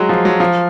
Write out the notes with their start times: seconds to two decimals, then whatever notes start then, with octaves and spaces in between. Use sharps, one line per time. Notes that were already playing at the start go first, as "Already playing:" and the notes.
Already playing: F#3 G#3
0.09 F3
0.25 F#3
0.40 F3